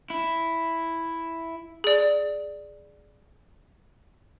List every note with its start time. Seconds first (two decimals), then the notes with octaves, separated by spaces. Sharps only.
0.10 E4
1.84 G#4 D5